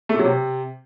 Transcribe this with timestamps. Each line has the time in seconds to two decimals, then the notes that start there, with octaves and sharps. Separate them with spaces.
0.09 A3
0.14 A#2
0.19 F#3
0.24 C3